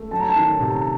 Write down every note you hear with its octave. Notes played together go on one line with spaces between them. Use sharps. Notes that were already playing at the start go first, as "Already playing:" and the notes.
Already playing: A3
F#3 A5
A#5
A5
D#3
C3